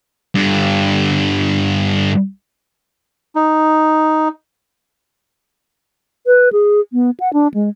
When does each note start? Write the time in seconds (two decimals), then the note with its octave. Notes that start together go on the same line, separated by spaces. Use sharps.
0.35 G2 D3
3.35 D#4
6.26 B4
6.53 G#4
6.93 B3
7.20 F#5
7.33 D4
7.54 G#3